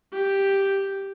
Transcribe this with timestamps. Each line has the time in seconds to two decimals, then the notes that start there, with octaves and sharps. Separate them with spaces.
0.13 G4